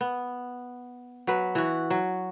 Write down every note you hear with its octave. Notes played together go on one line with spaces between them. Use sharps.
B3
F#3 B4
E3 F#4
F#3